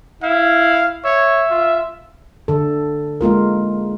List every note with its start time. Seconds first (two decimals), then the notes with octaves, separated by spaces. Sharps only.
0.23 E4 F5
1.05 C#5 E5
1.51 F4
2.48 D3 A4
3.21 G#3 A#3 F4 A#4